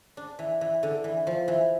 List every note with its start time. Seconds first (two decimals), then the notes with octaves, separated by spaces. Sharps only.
0.17 D4
0.39 E3
0.61 E3
0.83 D3
1.04 E3
1.27 F3
1.48 E3